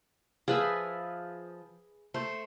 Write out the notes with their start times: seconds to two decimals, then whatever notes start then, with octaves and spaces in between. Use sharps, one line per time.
0.48 F3 G#4 B4 E5
2.14 A3 C5